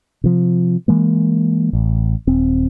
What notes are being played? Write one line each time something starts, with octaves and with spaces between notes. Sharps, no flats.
C3 F3
E3 G#3 A#3
A1
D#1 C4